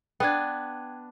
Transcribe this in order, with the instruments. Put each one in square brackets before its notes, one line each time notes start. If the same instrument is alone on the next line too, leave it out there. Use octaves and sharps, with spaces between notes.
[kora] B3 D4 [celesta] G5 G#6